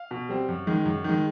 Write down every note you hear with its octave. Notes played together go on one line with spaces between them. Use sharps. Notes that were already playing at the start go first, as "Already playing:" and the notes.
Already playing: F5
B2
G3 C4
F#2
D#3 G#3
F#2
D#3
G#3